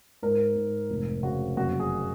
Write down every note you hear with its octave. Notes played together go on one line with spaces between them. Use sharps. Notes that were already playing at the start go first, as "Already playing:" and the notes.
G#2 A#4
G#2
F1
C#3 F#4
F#1 F#4
G#4